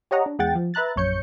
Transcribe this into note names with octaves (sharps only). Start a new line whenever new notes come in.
G4 C#5 D#5 F#5 A#5
D4
E2 G#3 F#5 G5 A6
F3
B4 E5 A#5 F#6 A6
A#1 F#2 C#5 G6 C#7